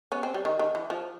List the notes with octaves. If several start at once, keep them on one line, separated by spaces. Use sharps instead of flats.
B3 C#4
C4
G3
D#3
D#3
E3
F3